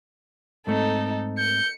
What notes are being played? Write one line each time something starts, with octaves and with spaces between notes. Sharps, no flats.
G#2 A3 C4 D#4 A4
G6 C#7